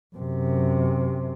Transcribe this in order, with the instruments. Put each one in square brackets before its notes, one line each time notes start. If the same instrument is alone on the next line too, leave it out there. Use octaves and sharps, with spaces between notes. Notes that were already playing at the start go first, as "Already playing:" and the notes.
[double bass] F#2 C3